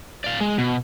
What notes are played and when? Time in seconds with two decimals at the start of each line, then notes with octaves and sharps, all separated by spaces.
0.24 D5 F5
0.41 G#3
0.58 B2